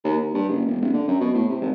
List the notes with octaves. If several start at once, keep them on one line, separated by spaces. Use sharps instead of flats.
D#2
D#2
G2
F#1
E1
D#1
D3
F#2
B2
A2
C3
G#1